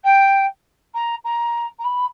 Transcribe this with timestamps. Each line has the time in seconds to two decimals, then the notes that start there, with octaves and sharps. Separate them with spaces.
0.04 G5
0.94 A#5
1.24 A#5
1.78 A#5
1.84 B5